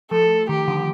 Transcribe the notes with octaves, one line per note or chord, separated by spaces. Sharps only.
F3 A3 A4
D#3 G4
D3 F3